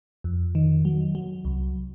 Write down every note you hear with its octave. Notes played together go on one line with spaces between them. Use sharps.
F2
D#3
F#3
F#3
C2